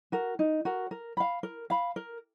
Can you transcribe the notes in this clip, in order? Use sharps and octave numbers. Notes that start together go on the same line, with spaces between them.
F#4 A#4
D#4
F#4 A#4
A#4
F5 B5
A#4
F5 B5
A#4